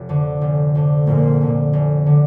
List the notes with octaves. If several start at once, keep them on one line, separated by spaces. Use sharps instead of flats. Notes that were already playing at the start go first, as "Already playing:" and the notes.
Already playing: F1
F2 D3
F1
F2 D3
F1 A#2
F2 D3
F1
D3